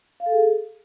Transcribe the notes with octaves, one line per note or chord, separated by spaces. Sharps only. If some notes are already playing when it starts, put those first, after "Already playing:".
F5
A4
G#4